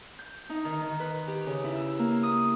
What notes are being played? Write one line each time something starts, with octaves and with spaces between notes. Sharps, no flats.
G6
D#4
D#3
D#3
B4
G4
C#3
E4
E6
A#3
D#6